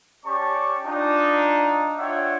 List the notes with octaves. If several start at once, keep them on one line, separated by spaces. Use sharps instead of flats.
C#4 G4 D5 A5 C#6
D4 D#4 F4
D4 F4 C#5 E5 F#5 G5